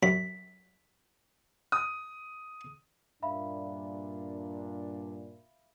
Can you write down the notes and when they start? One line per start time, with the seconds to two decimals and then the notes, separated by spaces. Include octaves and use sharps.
0.03 F#2 B6
1.72 D#6
3.23 G2 A#2 D4 E5 F5 B5